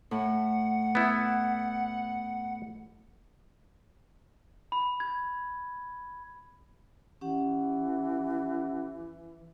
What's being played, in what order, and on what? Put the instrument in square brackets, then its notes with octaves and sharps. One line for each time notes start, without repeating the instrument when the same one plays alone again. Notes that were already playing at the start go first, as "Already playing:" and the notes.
[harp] A2 [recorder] F#5
[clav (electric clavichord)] B3 E4
[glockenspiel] B5
G#6
[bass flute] E3 [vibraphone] C#4 G4 F#5